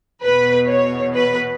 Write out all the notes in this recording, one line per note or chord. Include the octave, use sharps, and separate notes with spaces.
E2 B2 B4
C#5
B4